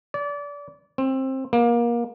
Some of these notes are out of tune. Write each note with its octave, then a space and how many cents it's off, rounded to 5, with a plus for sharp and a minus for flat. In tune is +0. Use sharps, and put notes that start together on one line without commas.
D5 -30
C4 +20
A#3 +25